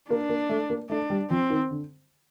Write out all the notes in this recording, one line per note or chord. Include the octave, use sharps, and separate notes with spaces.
A#3 D4
A#3
A3
A#3
A3 D4
G3
F3 C4
D#3
D3